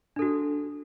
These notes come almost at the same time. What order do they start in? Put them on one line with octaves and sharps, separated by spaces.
D4 A4 F#4